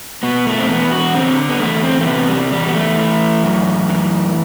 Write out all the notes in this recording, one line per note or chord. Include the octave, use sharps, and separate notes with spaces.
B2 B3
A3
C4
E2 B3
F#4
D3 C4
B3
E2 A3
C4
A3
C3 B3
G3
E2 G3
B3
A3
E3
F#2
E3